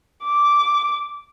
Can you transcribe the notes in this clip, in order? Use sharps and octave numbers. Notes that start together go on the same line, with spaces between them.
D6